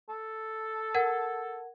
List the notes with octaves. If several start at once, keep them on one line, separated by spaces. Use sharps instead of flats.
A4
A#4 F#5 G#6